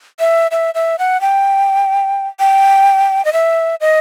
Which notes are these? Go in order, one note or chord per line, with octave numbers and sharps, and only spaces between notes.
E5
E5
E5
F#5
G5
G5
D#5
E5
D#5